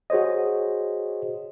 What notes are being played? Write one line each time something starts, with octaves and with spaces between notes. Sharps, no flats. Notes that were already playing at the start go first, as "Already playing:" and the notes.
F#4 G#4 C5 C#5 D#5